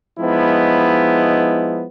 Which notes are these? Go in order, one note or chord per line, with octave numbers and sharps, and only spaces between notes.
F3 G#3 B3 D#4 E4